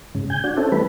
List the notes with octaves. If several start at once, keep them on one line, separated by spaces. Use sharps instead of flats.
G#2 C#3
G#5 G6
D4 F#4
C4 C#4 E4 A4
E3 G3 A3 B4